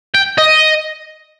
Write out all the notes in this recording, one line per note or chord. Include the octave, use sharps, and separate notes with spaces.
G5
D#5